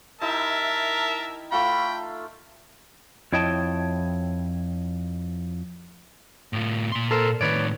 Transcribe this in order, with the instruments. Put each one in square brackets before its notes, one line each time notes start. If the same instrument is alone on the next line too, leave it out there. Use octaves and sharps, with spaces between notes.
[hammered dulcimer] D#4 E4 G4 [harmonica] A#4 E5 A5
[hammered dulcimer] A3 F4 [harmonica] G5 B5
[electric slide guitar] F2 E4 C#5 D#5 G5 A5
[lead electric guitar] A2 F4
A#2 C6
[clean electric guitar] A4 A#4 C5
[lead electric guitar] A2 D#3 [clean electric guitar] B4 C#5 D5